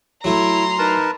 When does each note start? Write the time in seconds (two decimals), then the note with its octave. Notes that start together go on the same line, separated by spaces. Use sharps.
0.24 F#3 A3 E4 A#5 C6
0.79 D#4 A#4 B4 A5